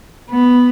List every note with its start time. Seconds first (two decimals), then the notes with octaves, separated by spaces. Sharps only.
0.30 B3